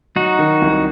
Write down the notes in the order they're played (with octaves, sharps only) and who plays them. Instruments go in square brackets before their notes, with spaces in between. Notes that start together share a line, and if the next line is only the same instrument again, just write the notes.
[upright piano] F#3 [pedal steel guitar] D#4 F#4
[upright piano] D#3
C2